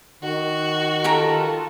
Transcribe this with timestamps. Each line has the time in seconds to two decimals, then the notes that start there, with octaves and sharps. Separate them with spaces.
0.23 D#3 F#4
1.04 F4 G4 A4 A#4 A#5